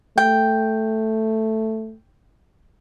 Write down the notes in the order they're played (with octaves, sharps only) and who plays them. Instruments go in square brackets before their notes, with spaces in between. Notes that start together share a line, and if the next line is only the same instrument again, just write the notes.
[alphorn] A3 [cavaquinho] G5